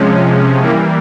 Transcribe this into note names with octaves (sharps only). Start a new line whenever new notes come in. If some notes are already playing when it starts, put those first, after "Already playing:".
Already playing: C3 F3 G#3 C#4
E3 G3 A#3